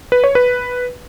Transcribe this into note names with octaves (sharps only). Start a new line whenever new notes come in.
B4
C#5
B4